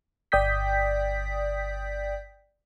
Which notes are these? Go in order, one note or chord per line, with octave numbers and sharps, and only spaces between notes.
G1 D5 G5 D#6 G6 B6